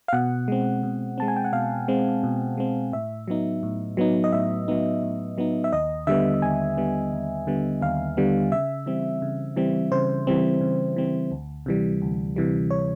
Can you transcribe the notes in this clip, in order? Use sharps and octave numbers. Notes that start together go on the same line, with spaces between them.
F5
B2 F#5
G#3 C4
B2
G#3 C4 A5
G#5
G5
F#5
B2 F5
G#3 C4
B2
G#3 C4
A2 E5
F#3 B3 D#4
A2
F#3 B3 D#4
D#5
A2 E5
F#3 B3 D#4
A2
F#3 B3 D#4
E5
D#2 D#5
D3 G3 B3 E5
D#2 G#5
D3 G3 B3
D#2
D3 G3 B3
D#2 F5
D3 G3 B3
C#3 E5
E3 G3 C4
C#3
E3 G3 C4
C#3 C5
E3 G3 C4
C#3
E3 G3 C4
D2
C3 E3 G3
D2
C3 E3 G3
C#5